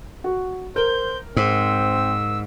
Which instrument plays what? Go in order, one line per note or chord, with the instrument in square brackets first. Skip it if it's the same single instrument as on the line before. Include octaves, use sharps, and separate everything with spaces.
[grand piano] F#4
[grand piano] A#4 [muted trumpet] C5 [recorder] G6
[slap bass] G#2 [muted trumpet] C4 [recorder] E6